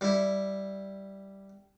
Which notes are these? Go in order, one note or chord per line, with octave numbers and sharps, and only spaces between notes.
G3 E4